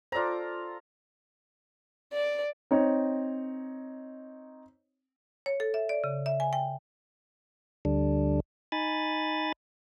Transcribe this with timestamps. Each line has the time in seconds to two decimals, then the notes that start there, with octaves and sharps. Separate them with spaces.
0.12 F4 A4 C5 D5 A#5
2.13 D5
2.71 C4 D#4 C#5
5.46 C#5
5.60 A4
5.74 E5
5.89 D5
6.04 C#3
6.26 E5
6.40 G#5
6.53 G5
7.85 D2 D3 G3 D4
8.72 D#4 G#5 B5 A6